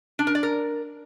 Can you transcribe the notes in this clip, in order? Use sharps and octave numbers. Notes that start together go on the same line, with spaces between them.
D4
A#4
D5
A#4